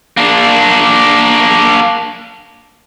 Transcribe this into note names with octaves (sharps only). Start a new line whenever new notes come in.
A#3 D4